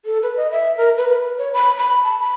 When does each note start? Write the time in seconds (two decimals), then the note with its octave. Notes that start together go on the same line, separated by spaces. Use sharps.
0.05 A4
0.23 B4
0.37 D#5
0.51 E5
0.77 A#4
0.97 B4
1.09 B4
1.38 C#5
1.53 B5
1.77 B5
2.04 A5
2.20 B5